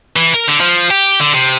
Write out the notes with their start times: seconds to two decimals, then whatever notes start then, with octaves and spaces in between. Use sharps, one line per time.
0.16 E3
0.34 A#4
0.48 D3
0.60 F3
0.90 G4
1.20 D3
1.34 C3